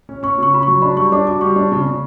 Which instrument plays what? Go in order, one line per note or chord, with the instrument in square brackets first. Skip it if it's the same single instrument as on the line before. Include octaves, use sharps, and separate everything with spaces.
[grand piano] C#4
[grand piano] C#4 [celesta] C#6
[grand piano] C#3 [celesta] C#6
[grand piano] C#3 [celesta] B5
[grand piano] F#3 [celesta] C#6
[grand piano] D4 [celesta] B5
[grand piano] G3 [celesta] C#6
[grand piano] D4 [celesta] D6
[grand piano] F#4 [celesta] D6
[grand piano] G3 [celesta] C#6
[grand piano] D4
C#3
C#3